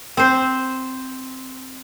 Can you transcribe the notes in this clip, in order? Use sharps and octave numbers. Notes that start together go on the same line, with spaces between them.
C4 C5